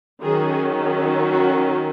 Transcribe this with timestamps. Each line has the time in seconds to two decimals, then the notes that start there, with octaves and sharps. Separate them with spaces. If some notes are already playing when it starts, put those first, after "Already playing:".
0.23 D#3 F#3 C#4 G#4
1.31 F#4